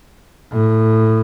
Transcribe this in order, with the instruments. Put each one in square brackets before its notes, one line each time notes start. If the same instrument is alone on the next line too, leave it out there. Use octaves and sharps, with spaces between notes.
[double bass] A2